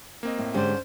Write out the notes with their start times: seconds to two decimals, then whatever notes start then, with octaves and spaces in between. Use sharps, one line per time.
0.23 A#3 C4 D#5
0.38 A2
0.54 G#2 D3 C#4 G4 C5 D5